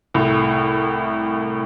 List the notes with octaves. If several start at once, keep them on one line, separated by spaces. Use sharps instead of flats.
C2 A2